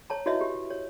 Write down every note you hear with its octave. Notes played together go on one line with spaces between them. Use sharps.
C#5 A5 A#5
E4 F#4 B4 C#5 D#5 E5
G4
C#5